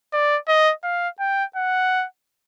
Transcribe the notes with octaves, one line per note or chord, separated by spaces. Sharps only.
D5
D#5
F5
G5
F#5